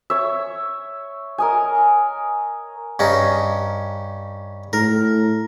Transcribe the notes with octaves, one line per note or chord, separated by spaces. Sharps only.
C#5 E5
A#4 D#5 G#5
G2 C#4 D#4
A2 A#4